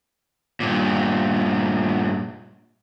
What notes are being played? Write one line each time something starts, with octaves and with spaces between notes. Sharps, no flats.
G2 A#2